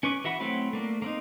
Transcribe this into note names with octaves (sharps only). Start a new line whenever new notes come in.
C#4 B4 C#6 D6
E3 F#4 E5 F#5 B5
F#3 A3 C4 E4 B4
A3 A#3 D4
A#3 C4 D#4